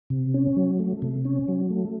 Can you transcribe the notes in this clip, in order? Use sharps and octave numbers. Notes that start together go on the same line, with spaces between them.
C3
C#4
F#3
A3
C3
C#4
F#3
A3